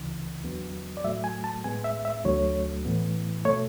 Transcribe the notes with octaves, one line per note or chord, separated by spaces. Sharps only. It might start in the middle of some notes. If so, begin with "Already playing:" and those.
Already playing: C#2 C#3 E3
E2 D3 F#3 B3
D5
A2 F#3 A3 E5
G#5
A5
A2 G#3 B3 G#5
E5
E5
D2 D3 F#3 A3 C#5
A2 E3 B3
B2 A3 C#5